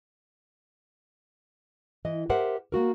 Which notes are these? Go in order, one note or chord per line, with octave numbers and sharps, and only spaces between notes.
E3 D#5
G4 A#4 C5 E5 F#5
A#3 F#4 A#4